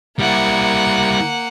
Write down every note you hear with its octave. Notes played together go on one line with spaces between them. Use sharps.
G3 A#3 E4 F#5